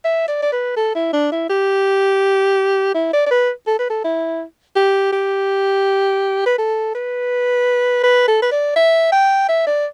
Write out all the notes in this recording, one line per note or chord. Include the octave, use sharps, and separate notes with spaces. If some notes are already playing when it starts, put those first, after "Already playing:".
E5
D5
D5
B4
A4
E4
D4
E4
G4
E4
D5
D5
B4
A4
B4
A4
E4
G4
G4
B4
A4
B4
B4
A4
B4
D5
E5
G5
E5
D5